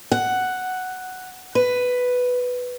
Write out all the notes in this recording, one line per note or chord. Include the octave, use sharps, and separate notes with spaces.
F#5
B4